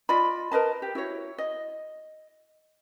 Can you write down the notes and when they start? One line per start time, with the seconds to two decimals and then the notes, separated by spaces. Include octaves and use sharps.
0.09 F4 D5 D#5 B5
0.52 A#4 B4 D#5 A5
0.82 G4
0.95 E4 F#4 C#5
1.38 D#5